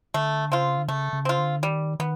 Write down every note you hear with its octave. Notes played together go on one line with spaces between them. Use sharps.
D3 A3
C#3 C4 F4
D3
C#3 A3
C#3
C4 F4
D3
D#3 G3
D#3 B3